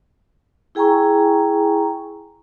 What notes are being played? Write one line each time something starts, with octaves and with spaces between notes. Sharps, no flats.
E4 G#4 G5 G#5 A#5 C#6